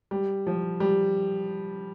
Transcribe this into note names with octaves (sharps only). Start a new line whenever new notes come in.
G3
F3
G3